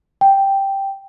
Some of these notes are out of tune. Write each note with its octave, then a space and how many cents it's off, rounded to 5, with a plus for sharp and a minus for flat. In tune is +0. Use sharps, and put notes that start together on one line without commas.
G5 +0